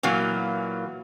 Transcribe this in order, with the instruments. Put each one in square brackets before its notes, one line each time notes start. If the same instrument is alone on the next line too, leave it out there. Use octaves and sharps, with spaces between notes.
[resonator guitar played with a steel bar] A#2 E3 F#3 A#3